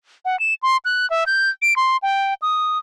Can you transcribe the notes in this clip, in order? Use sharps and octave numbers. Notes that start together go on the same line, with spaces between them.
F#5
E7
C6
F#6
E5
G6
D7
C6
G5
D#6